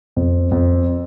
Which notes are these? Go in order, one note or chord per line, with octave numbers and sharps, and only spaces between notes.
F2
F2